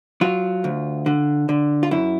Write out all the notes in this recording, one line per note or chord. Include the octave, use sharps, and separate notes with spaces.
F#3 F4
D2
D3
D3
F4
F#2 E4